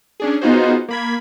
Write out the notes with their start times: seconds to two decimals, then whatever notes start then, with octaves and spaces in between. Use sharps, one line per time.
0.20 C#4 D4 G#4
0.41 B3 D#4 F4 F#4 G#4 C5
0.88 A#3 B5 G#6